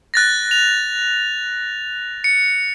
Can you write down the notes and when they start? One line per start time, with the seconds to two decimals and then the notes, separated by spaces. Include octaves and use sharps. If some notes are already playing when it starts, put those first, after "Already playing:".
0.14 F#6 A6 A#6
0.51 F7
2.24 C#7